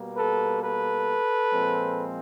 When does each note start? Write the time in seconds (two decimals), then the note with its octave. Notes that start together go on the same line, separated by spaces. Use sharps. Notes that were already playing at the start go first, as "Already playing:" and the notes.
Already playing: B2 G3 A#3
0.17 A4 B4
0.63 A4 B4
1.53 A#2 F3 G#3 C4